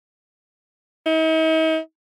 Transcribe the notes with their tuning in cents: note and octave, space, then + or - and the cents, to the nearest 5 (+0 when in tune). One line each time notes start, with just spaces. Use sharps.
D#4 +45